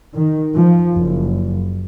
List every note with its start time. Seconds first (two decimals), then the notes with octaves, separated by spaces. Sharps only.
0.15 D#3
0.57 F3
0.96 F#1